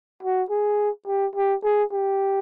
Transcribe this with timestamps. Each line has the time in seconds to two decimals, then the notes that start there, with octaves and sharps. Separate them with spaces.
0.23 F#4
0.50 G#4
1.07 G4
1.36 G4
1.64 G#4
1.92 G4